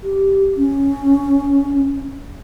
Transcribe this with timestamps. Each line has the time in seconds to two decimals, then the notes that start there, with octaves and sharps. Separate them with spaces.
0.03 G4
0.57 C#4